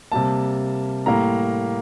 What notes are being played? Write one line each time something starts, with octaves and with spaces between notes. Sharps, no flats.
C3 G3 A#3 A5
A2 G3 A#3 A#5